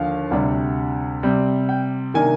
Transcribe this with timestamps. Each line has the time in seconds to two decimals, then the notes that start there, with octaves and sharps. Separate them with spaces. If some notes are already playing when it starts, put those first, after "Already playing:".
Already playing: D#2 D3 F3 F5
0.31 D2 C3 G3 D4
1.23 C3 G3 C4
1.69 G5
2.14 C3 D#3 A#3 D4 G#5